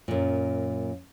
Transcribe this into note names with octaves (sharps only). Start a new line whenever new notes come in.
F#2 A#2